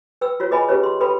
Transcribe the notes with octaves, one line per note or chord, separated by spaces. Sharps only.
B4 G5 E6
F4 F#4 C#5
G#4 B4 D#5 G5 G#5 B5
C#4 E4 G4 G#4 B4 C#5
C6
A4 B4 G5 B5